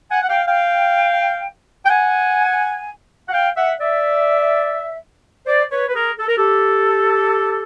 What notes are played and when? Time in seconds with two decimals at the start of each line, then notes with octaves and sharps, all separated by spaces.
0.11 F#5 G#5
0.22 F#5
0.29 F5 G5
0.47 F5 G5
1.86 G5
1.89 F#5 G#5
3.28 F#5
3.32 F5 G5
3.57 E5 F#5
3.80 D5 E5
5.47 C5 D5
5.71 B4 C#5
5.89 B4
5.95 G#4 A#4
6.18 A4
6.28 A#4
6.37 G4 A4